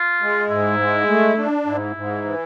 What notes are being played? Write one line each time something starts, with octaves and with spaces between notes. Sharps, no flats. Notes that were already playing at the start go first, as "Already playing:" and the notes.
Already playing: F4
G#3
G#2 E4
G#3
A3
D4
G#2 E4
G#2
E3